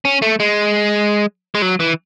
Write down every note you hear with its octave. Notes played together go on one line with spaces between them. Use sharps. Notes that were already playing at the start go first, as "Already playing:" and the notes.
C#4
A3
G#3
G#3
F#3
E3